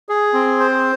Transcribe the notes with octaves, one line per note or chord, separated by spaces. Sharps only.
G#4
C4
C5